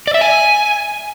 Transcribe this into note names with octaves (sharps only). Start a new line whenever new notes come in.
D5
E5
G#5